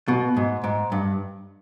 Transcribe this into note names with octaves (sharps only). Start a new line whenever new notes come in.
B2
G#2
G#2
G2